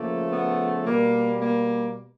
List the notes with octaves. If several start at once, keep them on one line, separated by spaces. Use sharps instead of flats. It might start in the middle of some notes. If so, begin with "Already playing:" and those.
Already playing: C#3 F3 A3 A#3
B3
B2 G3 A#3
A#3